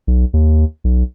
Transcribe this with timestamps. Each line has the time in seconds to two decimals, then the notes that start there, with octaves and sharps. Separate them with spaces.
0.07 B1
0.33 D#2
0.84 B1